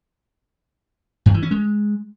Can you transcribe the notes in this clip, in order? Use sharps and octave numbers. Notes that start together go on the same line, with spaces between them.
G2
E3
C#4
G#3